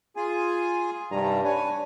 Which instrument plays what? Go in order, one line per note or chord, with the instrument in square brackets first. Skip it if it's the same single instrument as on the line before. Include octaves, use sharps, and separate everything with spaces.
[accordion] F4 G#4 G#5
[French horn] G2 [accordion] C3 D#3 A#5
[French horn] D4 [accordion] B4 C#5 G#5